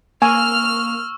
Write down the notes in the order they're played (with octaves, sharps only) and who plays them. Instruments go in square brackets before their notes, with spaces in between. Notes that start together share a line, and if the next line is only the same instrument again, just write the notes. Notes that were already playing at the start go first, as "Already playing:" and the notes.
[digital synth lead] A#3 [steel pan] G#5 [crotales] C#6 E6 [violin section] F6